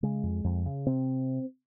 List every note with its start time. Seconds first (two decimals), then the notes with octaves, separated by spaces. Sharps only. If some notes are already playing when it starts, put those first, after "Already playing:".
0.03 C#3 G#3
0.23 F2
0.44 F2
0.66 C#3
0.86 C3 C4